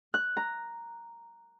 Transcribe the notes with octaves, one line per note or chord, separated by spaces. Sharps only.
F#6
A#5